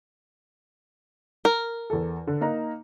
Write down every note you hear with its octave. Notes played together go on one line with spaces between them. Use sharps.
A#4
E2 A4
D3
A#3 D#4 A#5